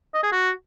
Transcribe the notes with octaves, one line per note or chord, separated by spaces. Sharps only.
D#5
G#4
F#4